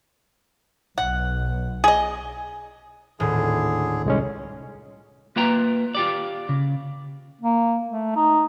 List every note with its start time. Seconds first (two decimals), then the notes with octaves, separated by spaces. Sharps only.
0.98 B1 F#5
1.84 G#4 D#5
3.20 D#1 A2 D3 G#4
4.06 C2 G#3 C#4
5.36 A#3 F4 B4 E5 G5 A#5
5.95 F4 G4 D5
6.49 C#3
7.41 A#3
7.88 A3
8.16 D#4